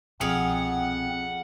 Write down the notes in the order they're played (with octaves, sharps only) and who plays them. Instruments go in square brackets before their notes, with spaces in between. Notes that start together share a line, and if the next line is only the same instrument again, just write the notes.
[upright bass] C2 B2 [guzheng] F2 G#4 F5 [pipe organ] C4 [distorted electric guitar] F#5